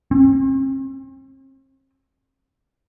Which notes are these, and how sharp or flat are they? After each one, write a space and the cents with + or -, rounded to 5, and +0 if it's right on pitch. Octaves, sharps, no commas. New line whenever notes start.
C4 +45